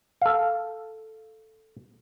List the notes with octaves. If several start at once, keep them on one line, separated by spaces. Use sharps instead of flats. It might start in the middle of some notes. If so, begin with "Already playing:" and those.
A4 F5